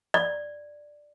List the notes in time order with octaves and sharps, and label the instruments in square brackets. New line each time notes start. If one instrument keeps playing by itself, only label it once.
[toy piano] D5